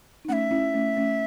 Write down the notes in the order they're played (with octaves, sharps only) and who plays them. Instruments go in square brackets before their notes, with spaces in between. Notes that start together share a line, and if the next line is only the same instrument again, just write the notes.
[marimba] D#4
[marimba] A3 C#4 [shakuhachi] E5 F#5
[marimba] C#4 E4
A3 C#4
A3 C#4